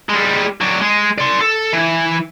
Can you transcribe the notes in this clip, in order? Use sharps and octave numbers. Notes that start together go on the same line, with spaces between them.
G3 G#3
F#3 D4
G#3
D5 C6
A4
E3